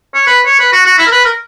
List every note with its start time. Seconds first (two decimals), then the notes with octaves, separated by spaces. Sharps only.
0.14 C#5
0.27 B4
0.46 C#5
0.59 B4
0.73 F#4
0.85 F#4
0.98 E4
1.06 A#4
1.12 B4
1.25 A#4